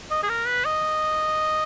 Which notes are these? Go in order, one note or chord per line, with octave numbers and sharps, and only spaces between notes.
D#5
G#4
A#4
B4
D#5